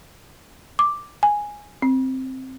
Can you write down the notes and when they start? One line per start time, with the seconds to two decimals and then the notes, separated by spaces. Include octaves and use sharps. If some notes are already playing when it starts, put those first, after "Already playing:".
0.79 D6
1.23 G#5
1.82 C4